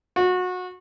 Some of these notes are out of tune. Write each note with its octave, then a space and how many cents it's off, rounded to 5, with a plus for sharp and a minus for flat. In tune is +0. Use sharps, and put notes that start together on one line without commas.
F#4 -25